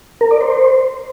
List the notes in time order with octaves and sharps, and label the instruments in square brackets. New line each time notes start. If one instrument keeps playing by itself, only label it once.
[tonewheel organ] A#4
D5
C5